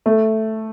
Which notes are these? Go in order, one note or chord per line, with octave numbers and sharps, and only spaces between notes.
A3